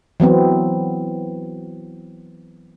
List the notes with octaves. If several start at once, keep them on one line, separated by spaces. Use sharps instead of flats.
E3 F#3 B3 C4